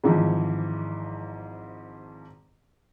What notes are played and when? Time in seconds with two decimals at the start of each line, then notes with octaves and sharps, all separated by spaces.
0.04 G#1 G#2 E3 F3